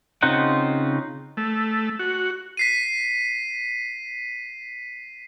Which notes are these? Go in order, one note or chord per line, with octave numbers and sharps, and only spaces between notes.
C#3 C4 D#4 F4 F#5
A3
F#4
B6 C7 D#7